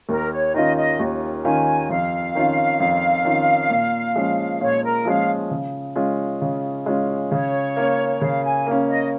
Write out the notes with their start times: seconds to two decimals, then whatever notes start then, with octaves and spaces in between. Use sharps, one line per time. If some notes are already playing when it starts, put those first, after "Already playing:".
0.09 D#2 A#4
0.32 C#5
0.54 D#3 C#4 F4 D#5
0.76 D#5
1.00 D#2
1.45 D#3 C#4 F4 G#5
1.89 F2 F5
2.35 D#3 C#4 F4
2.80 F2
3.25 D#3 C#4 F4
3.70 A#2
4.16 F3 G#3 C#4 F4
4.60 A#2 C#5
4.83 A#4
5.05 F3 G#3 C#4 F4 F5
5.51 C#3
5.96 G#3 C#4 F4
6.42 C#3
6.86 G#3 C#4 F4
7.31 C#3 C#5
7.77 A#3 C#4
8.21 C#3 F5
8.44 G#5
8.67 A#3 C#4
8.89 D#5